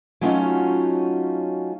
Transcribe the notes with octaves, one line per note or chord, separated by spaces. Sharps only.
F#3 A3 C#4 D#4 F4 F#4